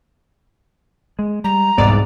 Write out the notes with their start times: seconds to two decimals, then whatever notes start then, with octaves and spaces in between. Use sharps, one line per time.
1.19 G#3
1.44 G3 A#5
1.78 E1 C2 G#2 B3 D5